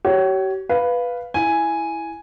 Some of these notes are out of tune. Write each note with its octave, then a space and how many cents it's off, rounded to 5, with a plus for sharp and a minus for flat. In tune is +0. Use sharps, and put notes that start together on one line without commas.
G4 -45 C#5 +5
B4 +0 F5 +0
E4 +0 G#5 +0